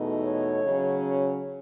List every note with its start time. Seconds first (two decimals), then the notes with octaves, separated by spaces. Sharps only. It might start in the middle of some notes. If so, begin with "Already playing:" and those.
Already playing: E2 B2 A3 D#4
0.23 C#5
0.64 C#3 F#3 C#4